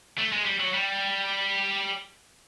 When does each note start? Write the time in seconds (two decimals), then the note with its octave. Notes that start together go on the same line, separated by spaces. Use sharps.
0.18 A3
0.32 G#3
0.46 G3
0.60 F#3
0.74 G3